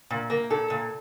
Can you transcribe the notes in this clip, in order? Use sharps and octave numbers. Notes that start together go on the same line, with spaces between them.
A#2
A#3
A#2 A4
A#2